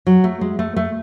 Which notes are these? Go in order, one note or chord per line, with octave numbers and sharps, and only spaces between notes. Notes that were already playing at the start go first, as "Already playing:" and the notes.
F#3
A3
G#3
A3
A3